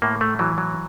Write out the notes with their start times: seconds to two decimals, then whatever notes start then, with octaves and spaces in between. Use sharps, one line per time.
0.02 A2 A#3
0.21 A3
0.39 E3 F#3
0.58 F#3